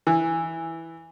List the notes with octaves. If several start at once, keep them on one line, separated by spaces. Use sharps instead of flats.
E3